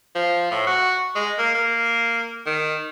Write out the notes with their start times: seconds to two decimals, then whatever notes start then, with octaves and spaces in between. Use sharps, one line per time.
0.15 F3
0.51 A2
0.67 F#4
1.16 G#3
1.39 A#3
1.55 A#3
2.47 D#3